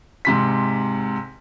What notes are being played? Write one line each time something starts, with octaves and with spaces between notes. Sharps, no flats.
G#2 C3 B6